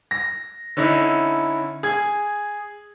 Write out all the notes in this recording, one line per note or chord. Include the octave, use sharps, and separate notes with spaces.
A#6
D3 C#4 D#4 E4
G#4 G#6